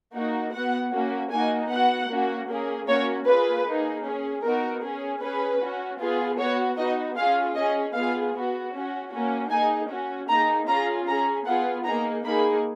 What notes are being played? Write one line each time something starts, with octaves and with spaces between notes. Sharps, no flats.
A#3 D#4 F#4
B3 F#4 F#5
A#3 C#4 F#4
A#3 D#4 F#4 G#5
B3 F#4 F#5
A#3 C#4 F#4
A#3 C#4 G#4
A#3 C#4 F#4 C#5
A#3 F4 G#4 B4
A#3 D#4 G#4
C#4 G#4
B3 D#4 F#4 A#4
C#4 G#4
C#4 G#4 B4
C#4 F#4
B3 F4 G#4
B3 F#4 C#5
B3 D#4 F#4 D#5
C#4 F4 G#4 F5
C#4 G#4 D#5
B3 F4 G#4 F5
B3 F#4
C#4 F#4
A#3 C#4 F#4
A#3 D#4 G#4 G#5
C#4 F#4
A#3 D#4 G#4 A#5
C#4 F4 G#4 A#5
C#4 G#4 A#5
B3 F4 G#4 F#5
A#3 D#4 G#4 A#5
A#3 D#4 G#4 B5